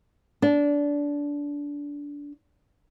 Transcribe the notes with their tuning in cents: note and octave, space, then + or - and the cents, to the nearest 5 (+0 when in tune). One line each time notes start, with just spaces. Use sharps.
D4 -20